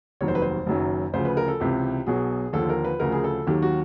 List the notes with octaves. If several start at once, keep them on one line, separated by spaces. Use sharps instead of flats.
F1 D#2 D#3 F#3 C#5
C5
B4
C5
F#1 F#2 D#3 F#3
D2 C#3 F3 C5
B4
A#4
A4
C#2 C3 E3 G4
B1 B2 F#3 G#4
D#2 D3 F3 A4
A#4
B4
D2 C#3 F3 A#4
G#4
A4
D#2 D#3 F#3 G4
F#4